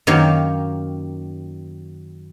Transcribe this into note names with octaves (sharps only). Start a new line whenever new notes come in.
F#2 D#3 A#3 G4 C#5 F5